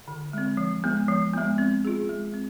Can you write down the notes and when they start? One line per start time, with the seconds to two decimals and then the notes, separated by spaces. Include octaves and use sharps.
0.08 D3
0.33 G#3 C4
0.57 F3
0.84 G#3 B3
1.08 F3
1.33 G#3 B3
1.58 C4
1.85 F4 G#4
2.09 G#3
2.34 C4